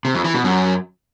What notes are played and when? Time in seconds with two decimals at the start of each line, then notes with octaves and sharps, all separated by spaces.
0.05 C3
0.15 F2
0.24 E3
0.34 B2
0.44 F#2